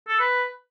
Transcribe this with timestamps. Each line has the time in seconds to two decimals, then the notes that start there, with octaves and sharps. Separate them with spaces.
0.08 A4
0.19 B4